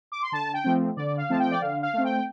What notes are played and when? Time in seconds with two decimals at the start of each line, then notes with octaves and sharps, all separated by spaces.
0.12 D6
0.22 C6
0.32 D3 A5
0.54 G5
0.64 F3 A3 C4
0.97 D3 D5
1.17 F5
1.29 F3 A3 C4 A5
1.40 G5
1.51 D5
1.61 D3 F5
1.83 F5
1.93 A3 C4
2.04 G5